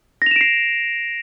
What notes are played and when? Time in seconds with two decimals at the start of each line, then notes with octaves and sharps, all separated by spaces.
0.22 A#6
0.26 F7
0.31 E7
0.36 D7
0.41 C7